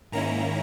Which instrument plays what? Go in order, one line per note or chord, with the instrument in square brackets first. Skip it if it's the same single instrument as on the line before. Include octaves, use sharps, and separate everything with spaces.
[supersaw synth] G#2 D#3 A#3 C#4 E4 A#5